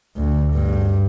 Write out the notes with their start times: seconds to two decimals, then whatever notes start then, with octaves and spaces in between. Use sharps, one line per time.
0.17 D2
0.52 G2